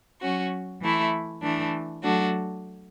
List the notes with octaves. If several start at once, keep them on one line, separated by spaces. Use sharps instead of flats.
F#3 C#4 F#4
E3 A3 E4
E3 A3 D4
F#3 A3 D4 F#4